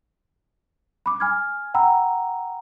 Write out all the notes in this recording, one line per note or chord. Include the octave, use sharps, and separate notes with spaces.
B5 D6
G#5 F6 G#6
F#5 G5 A#5 B5 E6